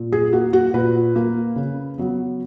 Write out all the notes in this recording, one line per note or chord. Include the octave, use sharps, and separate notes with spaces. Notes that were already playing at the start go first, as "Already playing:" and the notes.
Already playing: A#2
G#4
A#3 F#4
F#4
A#2 B4
A#3
C#3
F#3 B3